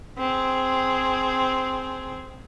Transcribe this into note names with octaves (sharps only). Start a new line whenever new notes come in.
C4 G#4